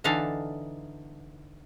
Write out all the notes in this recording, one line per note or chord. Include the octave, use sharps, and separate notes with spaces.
D3 E3 D4 D#4 A4 F5